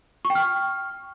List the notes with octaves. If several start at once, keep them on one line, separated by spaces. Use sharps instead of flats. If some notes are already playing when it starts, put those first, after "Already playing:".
C#6
G5
F6